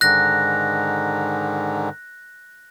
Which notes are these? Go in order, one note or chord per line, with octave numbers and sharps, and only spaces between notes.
G#2 D3 D#3 F#6 A#6